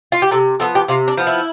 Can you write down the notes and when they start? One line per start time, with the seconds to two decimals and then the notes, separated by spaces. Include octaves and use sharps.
0.12 F4
0.22 G4
0.31 C3 A4
0.60 F3 B3 A4
0.75 G4
0.88 C3 F4
1.08 D4
1.17 F3 B3
1.27 E4